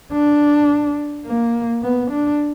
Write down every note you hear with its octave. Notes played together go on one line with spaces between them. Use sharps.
D4
A#3
B3
D4